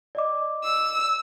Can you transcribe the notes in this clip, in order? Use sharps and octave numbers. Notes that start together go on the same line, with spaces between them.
D5 D#5 D6
E6